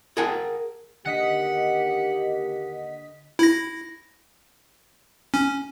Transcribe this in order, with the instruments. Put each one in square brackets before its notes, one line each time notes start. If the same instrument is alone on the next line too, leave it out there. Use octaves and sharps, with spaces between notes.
[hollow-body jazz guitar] G#4 A#4 F#5 G5 A5
[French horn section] D#2 A#3 G4 [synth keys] D3 D#5 B6 [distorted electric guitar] F#5
[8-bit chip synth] E4 A#6
C#4